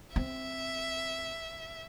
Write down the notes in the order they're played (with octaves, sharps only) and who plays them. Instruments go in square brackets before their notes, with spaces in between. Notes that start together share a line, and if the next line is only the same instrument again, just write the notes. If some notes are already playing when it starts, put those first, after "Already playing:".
[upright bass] C4 [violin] E5